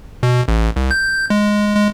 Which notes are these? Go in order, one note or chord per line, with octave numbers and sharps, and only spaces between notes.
B2
A1
C2
G6
G#3
G#3